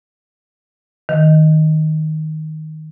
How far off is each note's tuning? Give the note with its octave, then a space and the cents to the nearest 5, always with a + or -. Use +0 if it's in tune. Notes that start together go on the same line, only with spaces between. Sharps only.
D#3 +5